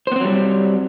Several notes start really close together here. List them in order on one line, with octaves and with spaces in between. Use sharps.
C5 B3 C4 F#3 G3